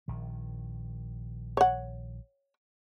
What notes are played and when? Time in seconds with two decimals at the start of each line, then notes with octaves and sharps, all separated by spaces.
0.08 A#1 D#3
1.57 C#5 F#5